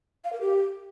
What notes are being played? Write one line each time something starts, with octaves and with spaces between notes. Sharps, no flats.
F5
A#4
G4